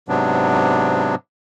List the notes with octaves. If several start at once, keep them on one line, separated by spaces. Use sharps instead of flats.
G#2 C3 F#3 B3 D4